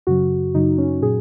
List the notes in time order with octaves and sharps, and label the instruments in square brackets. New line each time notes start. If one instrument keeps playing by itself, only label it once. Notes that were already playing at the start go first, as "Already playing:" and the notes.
[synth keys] F#2 C#3 F#3 F#4
F#2 C#3 F#3 D#4
C#4
A#2 F#3 G#4